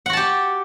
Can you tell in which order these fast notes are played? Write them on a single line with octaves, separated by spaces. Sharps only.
F#5 F#4 A5 G4